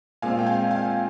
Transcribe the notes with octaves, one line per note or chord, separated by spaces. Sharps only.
A#2 G#3 C4 F5 G#5
G5
F5 G#5
F5 G#5